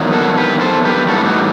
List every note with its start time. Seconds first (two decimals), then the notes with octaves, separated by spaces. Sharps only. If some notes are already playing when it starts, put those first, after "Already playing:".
Already playing: E2 D#3 F#3
0.13 F#4 A4
0.38 G4 B4
0.61 A4 C5
0.85 G4 B4
1.08 A2 E3 G3 F#4 A4
1.26 D#4 F#4